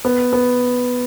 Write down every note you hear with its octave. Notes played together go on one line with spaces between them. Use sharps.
B3
B3